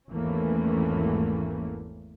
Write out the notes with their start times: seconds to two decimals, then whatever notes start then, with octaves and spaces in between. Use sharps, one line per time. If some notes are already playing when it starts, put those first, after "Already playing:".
0.11 G#1 E2 E3 A3 A#3 C#4